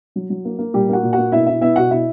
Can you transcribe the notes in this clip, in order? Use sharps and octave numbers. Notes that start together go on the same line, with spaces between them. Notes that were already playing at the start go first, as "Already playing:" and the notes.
F#3
F#3
A#3
A#3
A#2 G3 G4
A#3 F#4 F#5
A#2
F#4 F#5
A#3
B2 E4 E5
B2 E4 E5
B3 E4 E5
B2 F#4 F#5
B2 E4 E5